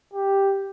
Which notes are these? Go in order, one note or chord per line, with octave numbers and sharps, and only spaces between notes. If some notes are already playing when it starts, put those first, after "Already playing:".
G4